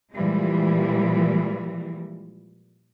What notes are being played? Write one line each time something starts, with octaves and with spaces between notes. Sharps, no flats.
A#2 E3 F3 G3 G#3